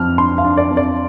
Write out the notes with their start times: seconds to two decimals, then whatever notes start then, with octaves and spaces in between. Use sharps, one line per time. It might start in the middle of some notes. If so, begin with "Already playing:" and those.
Already playing: F2 F3 F6
0.18 D4 C6
0.38 F5
0.44 D4
0.57 D5
0.71 F2
0.77 D5